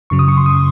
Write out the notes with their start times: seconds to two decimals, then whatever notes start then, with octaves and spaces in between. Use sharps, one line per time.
0.10 F#2 C#3 F#3 C#6
0.19 D#6
0.28 C#6
0.37 C6
0.46 D#6